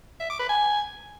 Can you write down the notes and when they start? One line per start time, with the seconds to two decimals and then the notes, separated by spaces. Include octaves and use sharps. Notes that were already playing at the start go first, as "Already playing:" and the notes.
0.20 E5
0.30 D6
0.39 B4
0.49 G#5